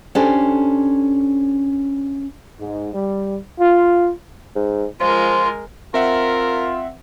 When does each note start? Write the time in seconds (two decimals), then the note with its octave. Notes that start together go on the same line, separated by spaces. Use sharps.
0.15 C#4 D4 G4 A4 C5
2.60 G#2
2.93 G3
3.60 F4
4.55 G#2
5.00 F3 G#3 F4 A#4
5.94 C4 F4 A#4 E5 F#5